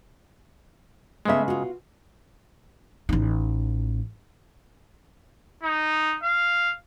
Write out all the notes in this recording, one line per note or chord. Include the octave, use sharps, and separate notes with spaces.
C#3 G#3 A3 B3 E5
F4 F#4
A1 D#4
D#4
F5